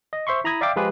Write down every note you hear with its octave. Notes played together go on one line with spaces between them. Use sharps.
D#5
C5 E5 C6 C#6
E4 A#5 B5 D#6 G#6
D5 E5 F5 G5 D6
F3 G#3 F4 G4 G#4 B4